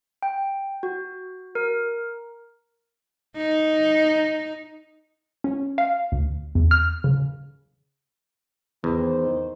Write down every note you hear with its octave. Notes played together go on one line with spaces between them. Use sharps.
G5
F#4
A#4
D#4
C#4
F5
D2
E2
F6
C#3
E2 D#3 C5